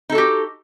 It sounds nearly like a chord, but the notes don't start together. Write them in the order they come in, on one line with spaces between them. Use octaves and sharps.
D#4 A4 F#4 G4